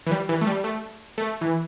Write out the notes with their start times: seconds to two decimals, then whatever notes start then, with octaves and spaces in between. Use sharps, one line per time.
0.07 E3
0.11 G3
0.29 E3
0.41 A3
0.47 G3
0.64 A3
1.18 A3
1.41 E3